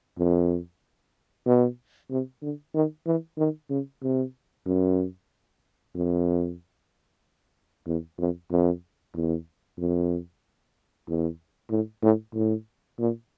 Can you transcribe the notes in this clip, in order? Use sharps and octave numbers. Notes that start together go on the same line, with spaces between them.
F2
B2
C3
D3
D#3
E3
D#3
C#3
C3
F#2
F2
E2
F2
F2
E2
F2
E2
A2
A2
A2
A#2